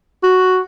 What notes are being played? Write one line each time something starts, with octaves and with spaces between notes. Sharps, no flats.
F#4